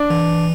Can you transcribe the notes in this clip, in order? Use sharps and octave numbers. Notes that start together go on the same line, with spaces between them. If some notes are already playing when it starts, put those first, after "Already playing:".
Already playing: D4
E3